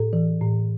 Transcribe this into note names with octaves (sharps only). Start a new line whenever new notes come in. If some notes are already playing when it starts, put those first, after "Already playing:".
Already playing: A2 A4
E3
A2